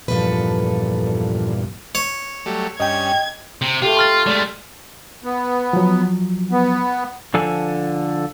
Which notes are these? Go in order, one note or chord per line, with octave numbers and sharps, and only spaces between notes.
E2 G2 A#2 F3 A4 B4
C#5
F#3 G3 A3
G2 C#4 D#5 G5 G#6
C3
A3 F4 G4
C6 F6 A6
G#3 A3 D5
B3
F3 F#3
B3
D3 F3 A4 G#5